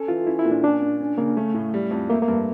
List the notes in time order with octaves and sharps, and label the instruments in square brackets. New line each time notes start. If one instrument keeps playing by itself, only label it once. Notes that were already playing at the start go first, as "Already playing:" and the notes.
Already playing: [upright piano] C#4 [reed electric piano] A4
[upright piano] E3 [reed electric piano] F4
[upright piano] C#4 [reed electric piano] E4
[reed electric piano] E4
[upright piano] A#2
[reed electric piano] D4
[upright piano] C#4 [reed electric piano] D4
[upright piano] A#2
C#4
[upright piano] C#3 [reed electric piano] A#3
[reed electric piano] A3 [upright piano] C#4
[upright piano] A2
G3
F2
[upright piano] A3 [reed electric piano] A#3
[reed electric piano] A#3
[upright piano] G2